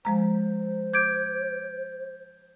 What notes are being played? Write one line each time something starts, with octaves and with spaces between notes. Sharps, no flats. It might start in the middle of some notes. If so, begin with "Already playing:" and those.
F3 G#3 C5 A#5
D6 G6 G#6 D7